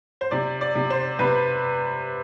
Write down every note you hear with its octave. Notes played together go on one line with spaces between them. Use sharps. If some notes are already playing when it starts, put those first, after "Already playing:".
C5
C3 D5
D5
C3
C5
C3 B4